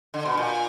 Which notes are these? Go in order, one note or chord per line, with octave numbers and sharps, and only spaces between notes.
D3
B2
A#2